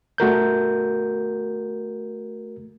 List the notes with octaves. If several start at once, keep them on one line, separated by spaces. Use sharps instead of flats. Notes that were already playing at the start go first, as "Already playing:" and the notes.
A3 F#4 A#4 G6